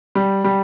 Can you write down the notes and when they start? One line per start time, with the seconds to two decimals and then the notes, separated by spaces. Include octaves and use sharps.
0.15 G3
0.44 G3